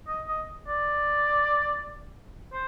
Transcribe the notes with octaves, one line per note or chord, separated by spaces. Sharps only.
D#5
D#5
D5
C5